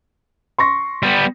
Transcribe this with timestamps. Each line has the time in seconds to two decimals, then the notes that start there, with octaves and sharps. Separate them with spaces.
0.58 C6 C#6 A#6
1.03 G3 B3